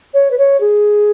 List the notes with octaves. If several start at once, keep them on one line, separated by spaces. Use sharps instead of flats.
C#5
B4
C#5
G#4